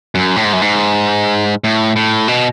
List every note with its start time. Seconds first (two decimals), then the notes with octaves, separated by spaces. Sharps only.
0.15 F#2
0.36 A2
0.44 G#2
0.53 F#2
0.62 G#2
1.64 A2
1.96 A2
2.28 B2